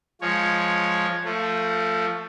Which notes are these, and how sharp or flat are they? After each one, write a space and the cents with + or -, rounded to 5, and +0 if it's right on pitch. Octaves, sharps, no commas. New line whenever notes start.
F3 +0 G#3 +0 C#5 +0
F3 +0 A3 +20